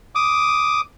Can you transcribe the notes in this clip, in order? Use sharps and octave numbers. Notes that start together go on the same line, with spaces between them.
D6 D#6